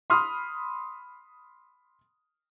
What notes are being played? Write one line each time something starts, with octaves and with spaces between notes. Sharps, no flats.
B5 C6 D#6 F6